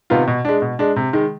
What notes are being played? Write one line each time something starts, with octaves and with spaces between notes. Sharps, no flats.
C3 D#3 B3 F4
B2
G#3 D4
B2
G#3 D4
C3
D#3 G#3